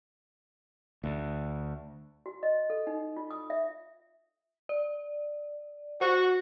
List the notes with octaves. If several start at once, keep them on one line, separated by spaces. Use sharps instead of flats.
D2
F#4
D#5
A4
D#4
F4
D#6
E5
D5
F#4 C5